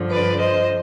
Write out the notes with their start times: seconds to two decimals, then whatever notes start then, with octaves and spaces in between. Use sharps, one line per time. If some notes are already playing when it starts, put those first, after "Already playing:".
Already playing: G2 D3 F3
0.11 B4 D5
0.40 C5 D#5